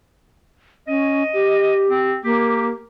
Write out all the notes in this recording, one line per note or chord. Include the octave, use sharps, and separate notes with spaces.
C#4 D#5
G4
C4
A#3 G4